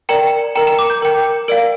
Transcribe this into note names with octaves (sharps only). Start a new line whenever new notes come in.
A#4 D5 G5 A#5
A#4 G5 A#5
A#5
D6
G6
A#4 G5
A#4 D5 F5 D7